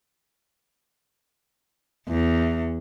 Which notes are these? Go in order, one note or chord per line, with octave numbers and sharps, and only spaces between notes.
E2